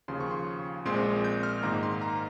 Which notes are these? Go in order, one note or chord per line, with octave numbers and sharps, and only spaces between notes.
D#2 C#3 F3 C6
C#6
C6
A#1 A#2 G#3 C4 C6
G6
F6
G#2 D#3 A#3 A#5
C6
A#5